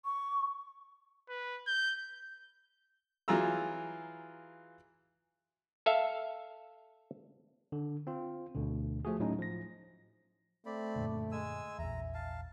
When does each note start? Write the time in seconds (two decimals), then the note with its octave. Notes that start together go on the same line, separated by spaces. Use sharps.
0.05 C#6
1.29 B4
1.67 G6
3.28 E3 F#3 F4 G#4 A#5 E6
5.86 A4 E5 F5
7.72 D3
8.07 C4 F4
8.55 D2 B2 D3
9.05 F3 A3 F#4 G#4
9.20 A2 F#3 C#4 D#4
9.39 F3 A#6
10.66 A3 C4 D5 B5
10.96 F#2 A#2 D3
11.32 G#3 G#5 E6
11.79 A#1 E2 E5 A#5
12.14 F5 A5